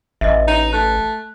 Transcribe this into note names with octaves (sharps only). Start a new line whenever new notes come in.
A1 D#5 E5
D#4
A3 F#6